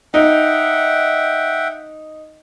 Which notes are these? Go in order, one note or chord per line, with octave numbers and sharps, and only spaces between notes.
D#4 E5 F#5 G5